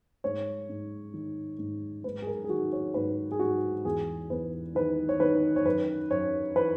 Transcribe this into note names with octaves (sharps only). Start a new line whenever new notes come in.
G#2 C#5
G#2
D#3
G#2
G#2 B4
G#4
A#4
G#4
D#3 F#4
C#5
G#2 B4
G#4
G#2 F#4
E2 G#4
E2 B4
D#3 B4
C#5
D#3 B4
C#5
F#2 B4
F#2 C#5
E3 B4